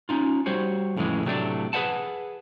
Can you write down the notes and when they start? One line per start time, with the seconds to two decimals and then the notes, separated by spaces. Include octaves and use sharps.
0.09 C#4 D#4 F4
0.46 G3 F#4 C5 C#5
0.97 F2 A2 C#3 E3 G#3
1.25 A2 C3 F#3 G3 A3 D4
1.73 G#4 B4 C5 D#5 F#5 A5